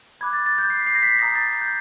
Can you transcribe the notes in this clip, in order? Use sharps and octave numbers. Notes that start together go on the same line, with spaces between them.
B5 D6 F#6 G#6
A6
A6
G6
C7
B6
C7
A#6
B6
A#5 D#6 G6 A#6
A6
G6